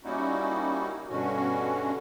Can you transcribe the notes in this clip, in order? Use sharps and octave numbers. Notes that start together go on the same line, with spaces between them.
G3 A#3 C#4 D#4 E4 F#4
G2 B2 D3 C#4 F#4